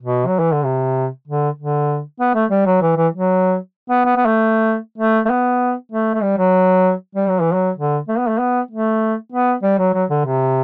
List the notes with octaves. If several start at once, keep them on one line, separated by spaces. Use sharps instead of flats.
B2
F#3
E3
D3
C3
D3
D3
B3
A3
G3
F#3
E3
E3
F#3
B3
B3
B3
A3
A3
A3
B3
A3
A3
G3
F#3
G3
F#3
E3
F#3
D3
A3
B3
A3
B3
A3
B3
G3
F#3
F#3
D3
C3